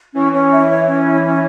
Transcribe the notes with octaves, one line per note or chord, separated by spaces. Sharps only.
E3 C#4
C#4
E4
C#5
C#4
E4
C#4